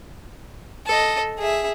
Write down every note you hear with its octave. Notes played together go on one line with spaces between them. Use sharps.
A4 D#5
G#4 E5